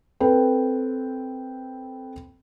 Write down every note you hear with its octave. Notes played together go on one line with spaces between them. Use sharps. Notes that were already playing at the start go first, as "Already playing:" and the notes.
C4 A4 B4 G5